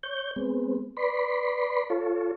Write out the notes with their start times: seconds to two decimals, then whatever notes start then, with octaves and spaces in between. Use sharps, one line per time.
0.03 C#5 G6
0.36 G#3 B3 C4
0.97 B4 D5 B5 C6
1.90 F4 A4 C#5